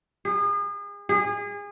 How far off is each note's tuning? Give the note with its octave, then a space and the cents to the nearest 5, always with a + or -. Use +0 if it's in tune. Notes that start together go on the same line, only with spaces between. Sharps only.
G#4 -35
G#4 -30